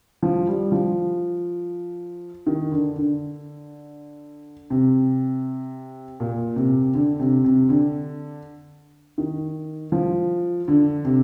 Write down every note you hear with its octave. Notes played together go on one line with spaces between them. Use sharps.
F3
G3
F3
D#3
D3
D3
C3
A#2
C3
D3
C3
C3
D3
D#3
F3
D3
C3